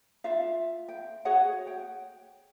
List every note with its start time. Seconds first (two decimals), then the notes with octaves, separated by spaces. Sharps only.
0.24 F4 E5 F5
0.89 G5
1.25 F#4 G#4 C#5 F#5
1.67 G5